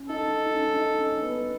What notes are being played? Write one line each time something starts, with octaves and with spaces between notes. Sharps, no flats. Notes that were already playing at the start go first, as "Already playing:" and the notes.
Already playing: C#4
D#4 A4
D#4
C#4
D#4
C#4
B3